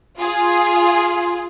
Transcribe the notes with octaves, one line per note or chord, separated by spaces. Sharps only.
F4 G#4